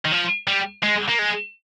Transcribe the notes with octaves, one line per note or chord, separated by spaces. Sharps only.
D#3
F3
G3
G#3
A#3
G#3